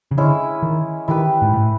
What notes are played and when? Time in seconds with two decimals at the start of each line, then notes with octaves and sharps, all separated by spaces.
0.11 C#3
0.17 D3 G#3 C#4 E4
0.62 D#3
1.08 D#3 E4 G4 B4
1.42 G#2
1.54 A2